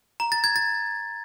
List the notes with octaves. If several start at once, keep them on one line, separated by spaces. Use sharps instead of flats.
A#5
A6
G#6
A6